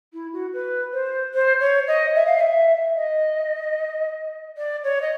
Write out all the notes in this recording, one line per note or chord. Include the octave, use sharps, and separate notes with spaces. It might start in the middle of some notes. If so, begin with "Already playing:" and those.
E4
F#4
B4
C5
C5
C#5
D#5
E5
F5
F5
E5
D#5
D5
C#5
D#5